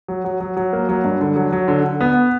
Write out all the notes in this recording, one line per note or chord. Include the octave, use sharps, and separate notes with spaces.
F#3
F#3
F#3
F#3
A#3
F#3
G2
D3
F#3
F#3
D3
D3
B3